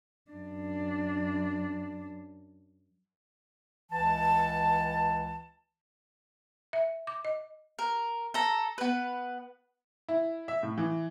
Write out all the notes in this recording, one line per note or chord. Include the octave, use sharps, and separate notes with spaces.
F#2 D4
C#2 E3 F#5 A5
E5
D6
D#5
A#4
A4 A#5
B3 B4
E4
E5
A2
E3